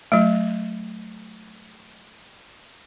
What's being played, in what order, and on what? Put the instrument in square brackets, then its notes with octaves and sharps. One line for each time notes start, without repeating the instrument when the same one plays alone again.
[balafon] F#3 A3